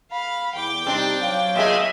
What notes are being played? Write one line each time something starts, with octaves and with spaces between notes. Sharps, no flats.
F5 B5
E2 G5 D6
C3 G3 C4 D4 D#4
F#3 C#5 F5
A#2 G#4 D#5 E5